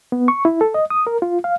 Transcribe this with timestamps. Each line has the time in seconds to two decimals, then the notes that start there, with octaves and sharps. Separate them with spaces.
0.12 B3
0.28 C#6
0.45 E4
0.61 A4
0.74 D#5
0.90 D#6
1.07 A#4
1.22 F4
1.44 F5